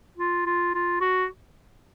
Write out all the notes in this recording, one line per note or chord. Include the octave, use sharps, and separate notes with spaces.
F4
F4
F4
F#4